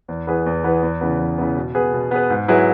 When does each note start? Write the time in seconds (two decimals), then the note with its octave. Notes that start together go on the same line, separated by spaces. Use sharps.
0.08 E2
0.27 E3 B3 G#4 B4
0.46 E2
0.64 E3 B3 G#4 B4
0.83 E2
1.01 C#3 E3 B3
1.19 E2
1.38 C#3 E3 B3
1.56 B2
1.75 B3 G#4 B4
1.93 B2
2.11 B3 G#4 B4
2.30 G#2
2.48 F#3 E4 G#4 B4